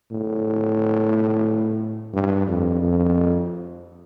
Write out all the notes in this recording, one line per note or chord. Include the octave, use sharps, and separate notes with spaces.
A2
G2
F2
F2